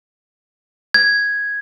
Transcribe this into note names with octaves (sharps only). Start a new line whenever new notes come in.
G#6